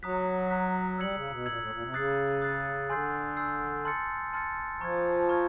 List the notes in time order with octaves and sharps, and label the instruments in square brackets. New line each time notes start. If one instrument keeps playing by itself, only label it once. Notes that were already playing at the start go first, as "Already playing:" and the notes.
[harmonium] F#3 [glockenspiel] A#5 D#6 F#6 B6
[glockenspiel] A#5 D#6 F#6 B6
[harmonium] G3 [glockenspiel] E6 G#6 C#7 F#7
[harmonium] C#3
B2
[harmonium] A#2 [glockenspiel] E6 G#6 C#7 F#7
[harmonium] A2
A#2
C3
[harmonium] C#3 [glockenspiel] D#6 F#6 A6 C7
[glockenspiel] D#6 F#6 A6 C7
[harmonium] D3 [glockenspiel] G#5 C6 E6 G6 C7
[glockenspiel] G#5 C6 E6 G6 C7
A5 C6 F6 A6 C#7
A5 C6 F6 A6 C#7
[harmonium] F3 [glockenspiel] A#5 C#6 F6 G#6
[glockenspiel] A#5 C#6 F6 G#6